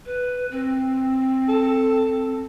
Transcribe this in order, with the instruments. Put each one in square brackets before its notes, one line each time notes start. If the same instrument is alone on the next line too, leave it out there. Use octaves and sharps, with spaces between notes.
[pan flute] B4
C4
[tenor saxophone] A4